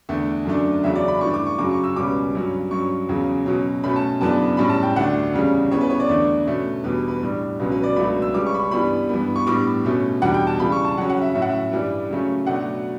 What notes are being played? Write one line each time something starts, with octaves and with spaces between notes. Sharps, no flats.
E2 D3 A3
F#2 D3 A3 D4
E2 C#3 F#3 C#4 E5
D5
B5
G2 E3 A3 D4 C#6
D6
C#6
F#2 C#3 F#3 D6
C#6
E6
C#2 B2 G3 C#4 D6
G2 F#3 C#4
G2 F#3 C#4 C#6
E2 C#3 F#3 C#4
B2 F#3 C#4
B2 A3 C#4 B5
A5
F#2 C#3 E3 B3 D4 A5
A2 G3 C#4 B5
A5
G5
D2 D3 A3 D4 F#5
E2 C#3 G3 C#4
C#3 E3 B3 C#5
B4
C#5
D5
E2 D3 A3 D4
B2 A3 C#4
E2 B2 G3 D4 B4
B4
A2 G3 D4
C#2 B2 F#3 C#4
B4
D5
C#2 B2 F#3 A3 D4 B5
E6
C#2 C#3 G3 C#4 D6
C#6
B5
C#6
G2 E3 G3 B3 B5
G2 E3 B3
C#6
A2 G3 B3 D4 D6
B2 A3 C#4
E2 B2 G3 D4 F#5
G5
A5
C#3 E3 G3 B5
C#6
A5
C#3 F#3 C#4 F#5
F#5
E5
A2 F#3 C#4 E5
F#5
E5
G2 E3 G3 D4
C#3 F#3 A3 C#4
B2 F#3 A3 D4 F#5